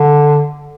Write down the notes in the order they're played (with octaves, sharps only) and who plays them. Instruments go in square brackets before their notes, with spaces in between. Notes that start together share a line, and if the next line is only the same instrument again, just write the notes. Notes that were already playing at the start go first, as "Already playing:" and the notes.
Already playing: [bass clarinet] D3